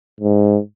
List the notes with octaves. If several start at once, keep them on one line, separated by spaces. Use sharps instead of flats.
G#2